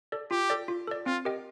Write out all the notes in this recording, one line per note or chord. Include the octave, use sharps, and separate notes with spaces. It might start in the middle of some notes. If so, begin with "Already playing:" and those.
A4 D5
F4 G4
A4 D5
F4
A4 D5
C4 F4
G4 A#4 D#5 G5